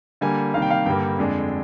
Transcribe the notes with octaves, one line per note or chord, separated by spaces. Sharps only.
D3 G3 A#3 G#5
C3 D#3 G3 A#3 F5
G5
F5
G2 D3 G3 A#3 G5
F2 D3 G#3 D4